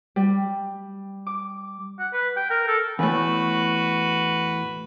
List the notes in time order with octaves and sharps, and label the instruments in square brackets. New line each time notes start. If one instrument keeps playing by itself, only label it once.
[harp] G3
D6
[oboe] F#5
B4
G5
A#4
A4
[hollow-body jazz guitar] E2 A2 [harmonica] F#4 B4